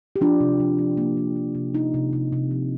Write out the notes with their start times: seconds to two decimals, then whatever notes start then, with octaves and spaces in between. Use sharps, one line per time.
0.16 G4
0.21 F3 D4 F4
0.41 C3
0.60 F3
0.78 F3
0.97 A#3
1.17 A#3
1.36 F3
1.55 C3
1.74 C3 D#4
1.94 C3
2.13 C3
2.32 C3
2.51 F3